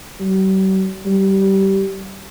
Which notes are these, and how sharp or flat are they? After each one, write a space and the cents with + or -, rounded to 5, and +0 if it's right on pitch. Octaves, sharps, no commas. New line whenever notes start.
G3 -45
G3 -20